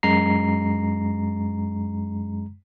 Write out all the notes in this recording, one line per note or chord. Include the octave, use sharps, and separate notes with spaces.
F#2 G#3 A#5 C7